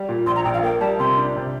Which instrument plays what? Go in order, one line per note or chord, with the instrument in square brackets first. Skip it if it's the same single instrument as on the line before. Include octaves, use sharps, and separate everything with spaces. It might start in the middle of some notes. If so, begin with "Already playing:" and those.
Already playing: [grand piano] G3
A#2
[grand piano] A#1 [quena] C6
[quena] A#5
[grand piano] A#1 [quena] G5
[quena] F5
[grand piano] A#3 [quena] G5
[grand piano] G3 [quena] A5
[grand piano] C3 [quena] C6
[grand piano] D4
C3